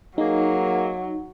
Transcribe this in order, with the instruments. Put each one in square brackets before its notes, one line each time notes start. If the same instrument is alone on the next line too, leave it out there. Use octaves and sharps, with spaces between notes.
[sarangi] F#3 [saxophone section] A#3 G#4 [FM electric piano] D#4